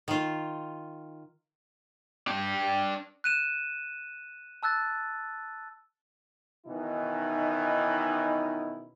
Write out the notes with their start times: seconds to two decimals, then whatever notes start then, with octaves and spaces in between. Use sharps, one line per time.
0.08 D#3 F4
2.27 D4 G5
3.24 F#6 D#7 E7
4.63 A5 E6 F#6 A6
6.67 B2 D#3 E3 C#4 D#4 E4